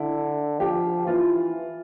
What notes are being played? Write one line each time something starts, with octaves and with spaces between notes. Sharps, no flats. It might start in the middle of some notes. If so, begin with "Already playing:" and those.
Already playing: D3 E4
F3 G4
E3 F4